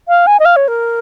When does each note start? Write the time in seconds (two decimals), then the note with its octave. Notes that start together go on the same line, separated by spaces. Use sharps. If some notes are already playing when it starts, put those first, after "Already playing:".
0.08 F5
0.27 G#5
0.40 D#5
0.45 F5
0.56 C#5
0.68 A#4